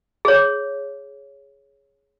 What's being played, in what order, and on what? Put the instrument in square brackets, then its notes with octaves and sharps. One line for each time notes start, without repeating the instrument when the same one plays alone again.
[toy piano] G#4 C#5